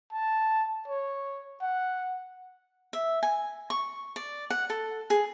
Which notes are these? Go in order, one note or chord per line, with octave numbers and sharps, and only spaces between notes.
A5
C#5
F#5
E5
G#5
C#6
D5
F#5
A4
G#4